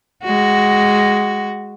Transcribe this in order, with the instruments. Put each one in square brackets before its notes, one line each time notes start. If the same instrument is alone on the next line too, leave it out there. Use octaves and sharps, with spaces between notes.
[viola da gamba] G#3 F#4